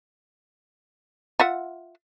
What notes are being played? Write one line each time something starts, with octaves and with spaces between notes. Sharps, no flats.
F4 E5 F#5